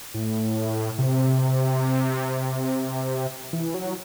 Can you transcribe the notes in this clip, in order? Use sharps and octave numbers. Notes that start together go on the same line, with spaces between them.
A2
C3
E3
F#3